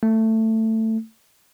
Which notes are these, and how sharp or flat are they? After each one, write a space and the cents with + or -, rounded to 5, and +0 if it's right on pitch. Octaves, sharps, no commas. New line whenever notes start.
A3 +15